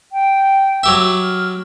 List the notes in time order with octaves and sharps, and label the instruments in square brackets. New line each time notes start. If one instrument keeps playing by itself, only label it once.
[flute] G5
[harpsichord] F#3 G4 E5
[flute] F6